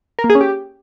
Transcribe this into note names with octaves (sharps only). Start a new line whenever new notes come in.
A#4
A#3
G#4
C#4
G4